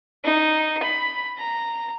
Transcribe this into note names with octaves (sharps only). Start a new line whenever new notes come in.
D#4
B5
A#5